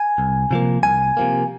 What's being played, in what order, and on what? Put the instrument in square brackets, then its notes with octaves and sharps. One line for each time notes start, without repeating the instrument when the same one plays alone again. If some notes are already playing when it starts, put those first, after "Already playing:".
Already playing: [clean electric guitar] G#5
C2
C3 F3 A#3
C2 G#5
C3 F3 A#3